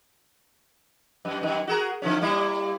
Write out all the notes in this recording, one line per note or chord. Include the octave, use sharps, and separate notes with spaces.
F#2
F#2 D#3
F#4 G#4 A#4
D3 F3 C#4
G3 A#3 E4